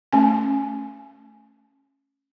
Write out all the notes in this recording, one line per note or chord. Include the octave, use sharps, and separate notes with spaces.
A3 C#4 G#5